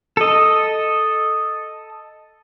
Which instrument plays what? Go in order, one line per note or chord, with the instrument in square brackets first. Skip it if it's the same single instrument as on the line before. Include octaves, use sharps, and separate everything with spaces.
[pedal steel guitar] A4 D#5